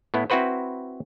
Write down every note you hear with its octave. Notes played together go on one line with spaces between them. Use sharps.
A2 B3 E4
C4 E4 F#4 B4 C5